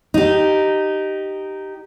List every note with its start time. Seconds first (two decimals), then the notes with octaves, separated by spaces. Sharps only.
0.14 D#4 G4